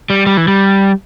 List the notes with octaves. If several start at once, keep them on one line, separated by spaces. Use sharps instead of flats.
G3
G3
E3
G3